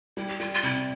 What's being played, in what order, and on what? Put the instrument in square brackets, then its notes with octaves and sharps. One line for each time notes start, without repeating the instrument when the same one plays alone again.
[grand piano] G3 [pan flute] E4
[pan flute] G4
[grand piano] G3 [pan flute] F4
[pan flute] F4
[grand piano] C3 [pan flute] E4